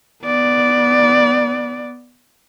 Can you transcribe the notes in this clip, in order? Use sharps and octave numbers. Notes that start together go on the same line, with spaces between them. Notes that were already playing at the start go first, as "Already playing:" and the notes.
B3 D5